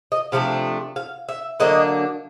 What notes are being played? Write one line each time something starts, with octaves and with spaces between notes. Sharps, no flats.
D#5
C3 F3 A3 D4 F5
F5
E5
D3 F#3 A#3 D4 D#5